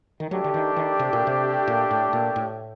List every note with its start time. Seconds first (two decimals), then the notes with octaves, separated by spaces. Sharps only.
0.20 D#3
0.31 F#3 A3 D4 G4
0.44 D3
0.54 D#3
0.76 D#3
0.99 C3
1.13 A#2
1.27 C3
1.67 A#2
1.91 A2
2.13 A#2
2.36 A2